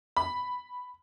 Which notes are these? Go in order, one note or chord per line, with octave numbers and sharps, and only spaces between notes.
B5